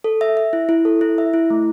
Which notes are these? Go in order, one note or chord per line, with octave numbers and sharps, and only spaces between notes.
A4
E5
E5
E4
E4
A4
E4
E5
E4
A3